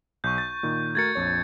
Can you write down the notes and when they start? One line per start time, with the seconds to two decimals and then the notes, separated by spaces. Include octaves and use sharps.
0.24 B1 C#6 G6
0.38 A6
0.63 A#2 D#3
0.95 A3 F#4 A#4 G#6 A6 C#7
1.15 A#1 F2 C#5